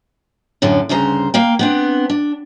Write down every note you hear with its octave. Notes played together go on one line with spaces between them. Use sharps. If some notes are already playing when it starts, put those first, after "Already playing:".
F#2 A2 D3
D2 G2 C#3 C5 A#5
A#3 F5 G5
B3 C4 D4
D4